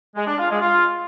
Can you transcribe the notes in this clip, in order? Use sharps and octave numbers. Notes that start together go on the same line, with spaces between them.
G#3
D4
F4
G#3
F4